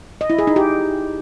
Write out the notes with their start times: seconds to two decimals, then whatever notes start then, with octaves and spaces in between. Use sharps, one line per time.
0.21 D#5
0.30 E4
0.38 G#4
0.47 D#4
0.56 G4